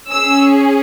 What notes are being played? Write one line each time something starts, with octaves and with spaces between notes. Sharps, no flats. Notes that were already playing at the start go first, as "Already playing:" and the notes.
C#4 G#4 E6